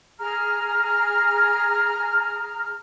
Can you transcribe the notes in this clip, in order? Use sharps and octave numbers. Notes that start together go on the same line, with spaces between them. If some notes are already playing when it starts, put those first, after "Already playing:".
G#4 A#5 F6